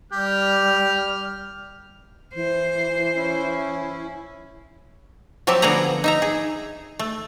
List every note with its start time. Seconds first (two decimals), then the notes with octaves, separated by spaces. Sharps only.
0.12 G3 G4 F6
2.35 E3 C5
3.16 C#4 E4
5.47 F3 F#3 C4 G4 E5 A5
5.62 D3 F3 B3 G#4 F#5 A#5
6.04 D#4 E5 A#5
6.22 G#4
6.99 A3